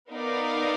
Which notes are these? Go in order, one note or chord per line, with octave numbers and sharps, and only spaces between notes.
B3 D#4 A#4 D5 F5